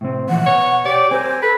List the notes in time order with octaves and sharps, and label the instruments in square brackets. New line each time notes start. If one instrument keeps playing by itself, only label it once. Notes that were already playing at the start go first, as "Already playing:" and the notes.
[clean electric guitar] A2 C3 C4
[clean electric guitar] A#2 E3 F3 [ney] F#5
[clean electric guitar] B2 [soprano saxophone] C#5
[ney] G4 [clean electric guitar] C#5 [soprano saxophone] D5
[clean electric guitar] C4 G4 A#4 [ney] C5 [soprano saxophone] G#5
[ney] A4 [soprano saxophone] B4